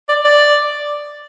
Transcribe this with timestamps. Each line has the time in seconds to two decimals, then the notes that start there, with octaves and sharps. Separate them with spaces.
0.09 D5
0.25 D5